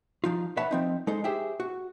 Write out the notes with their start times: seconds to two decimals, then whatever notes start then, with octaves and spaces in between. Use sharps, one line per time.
0.24 F3 D#4 F4
0.57 B4 C#5 E5 F#5 A5 B5
0.71 F3 C4 D#4
1.07 G#3 D#4 A4 C5
1.24 G4 G#4 C5 E5 G5
1.60 F#4